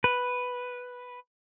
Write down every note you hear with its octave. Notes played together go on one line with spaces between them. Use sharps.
B4